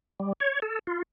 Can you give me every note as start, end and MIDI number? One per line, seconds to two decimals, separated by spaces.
0.20 0.33 55
0.40 0.60 73
0.62 0.79 69
0.87 1.02 65